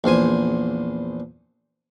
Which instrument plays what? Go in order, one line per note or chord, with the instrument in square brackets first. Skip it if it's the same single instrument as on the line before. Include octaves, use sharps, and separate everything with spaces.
[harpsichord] A#1 E2 C5 G#5